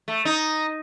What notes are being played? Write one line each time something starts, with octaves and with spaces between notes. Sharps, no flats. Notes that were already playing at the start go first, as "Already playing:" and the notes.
A3
D#4